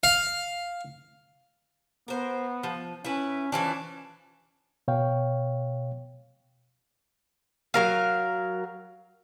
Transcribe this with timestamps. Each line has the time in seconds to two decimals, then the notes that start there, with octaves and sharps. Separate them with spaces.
0.03 F5
2.08 B3 A#4 C5
2.63 F3
3.05 C#4 E4 B4
3.52 E3 F3 C#4 D4
4.88 B2 C#5 F5 G5
7.74 F#3 A#4 F5